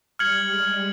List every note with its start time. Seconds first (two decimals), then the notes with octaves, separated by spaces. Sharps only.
0.19 G3 F6 G#6 C#7 F#7
0.48 G#3